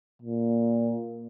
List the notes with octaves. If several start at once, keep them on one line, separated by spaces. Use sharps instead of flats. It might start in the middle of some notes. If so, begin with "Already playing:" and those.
A#2